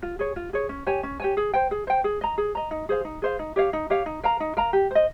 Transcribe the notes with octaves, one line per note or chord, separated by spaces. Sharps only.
F4
G#4 C#5
F4
G#4 C#5
C#4
G4 C#5 G#5
C#4
G4 C#5 G#5
G#4
C5 G5
G#4
C5 G5
G#4
D#5 A#5
G#4
D#5 A#5
D#4
G#4 C5 F5
D#4
G#4 C5 F5
D#4
G4 C#5 F5
D#4
G4 C#5 F5
D#4
A#4 F5 A#5
D#4
A#4 F5 A#5
G4
C5 D#5